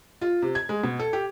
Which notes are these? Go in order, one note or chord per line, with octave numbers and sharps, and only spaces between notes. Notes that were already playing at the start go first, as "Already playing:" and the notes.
F4
C3
G#6
G#3
B2
A4
G4